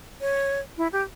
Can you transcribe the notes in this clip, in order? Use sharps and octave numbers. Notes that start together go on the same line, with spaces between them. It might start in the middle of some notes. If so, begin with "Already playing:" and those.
C#5
E4
G4